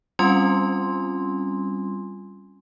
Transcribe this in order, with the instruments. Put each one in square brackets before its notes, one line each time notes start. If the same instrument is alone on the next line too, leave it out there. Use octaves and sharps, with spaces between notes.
[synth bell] G3 C4 C#4 F4 G#5 C6